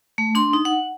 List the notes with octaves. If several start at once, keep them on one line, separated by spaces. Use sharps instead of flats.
A3
D4 C6
D#4
F#5